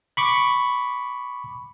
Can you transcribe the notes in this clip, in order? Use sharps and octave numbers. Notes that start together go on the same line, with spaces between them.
B5 C#6 D6